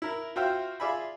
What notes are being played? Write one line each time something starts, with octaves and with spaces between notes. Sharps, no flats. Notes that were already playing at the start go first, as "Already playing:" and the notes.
E4 A#4
F4 F#4 C5 E5 G5 F6
F4 G#4 D5 E5 G#5 B5